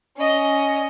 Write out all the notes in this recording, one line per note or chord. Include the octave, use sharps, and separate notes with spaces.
C#4 D#5